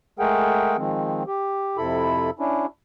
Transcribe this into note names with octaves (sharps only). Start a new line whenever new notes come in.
G#3 A3 G#4 A#4 F#5 G5
D#3 F3 G#3 C4
G4
F2 C3 E4 A4 B5
C#4 D4 E4